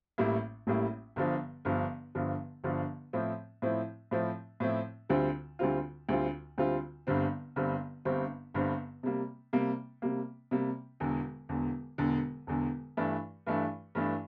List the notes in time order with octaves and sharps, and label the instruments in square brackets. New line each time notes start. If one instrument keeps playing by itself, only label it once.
[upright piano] A1 A2 G3 A#3 E4
A1 A2 G3 A#3 E4
G1 G2 D3 F3
G1 G2 D3 F3
G1 G2 D3 F3
G1 G2 D3 F3
A2 F3 C4 E4
A2 F3 C4 E4
A2 F3 C4 E4
A2 F3 C4 E4
D2 D3 G3 C4 F4
D2 D3 G3 C4 F4
D2 D3 G3 C4 F4
D2 D3 G3 C4 F4
G1 G2 D3 G3 C4
G1 G2 D3 G3 C4
G1 G2 D3 G3 C4
G1 G2 D3 G3 C4
C3 G3 A#3
C3 G3 A#3
C3 G3 A#3
C3 G3 A#3
E1 E2 D3
E1 E2 D3
E1 E2 D3
E1 E2 D3
G2 E3 A3 D4
G2 E3 A3 D4
G2 E3 A3 D4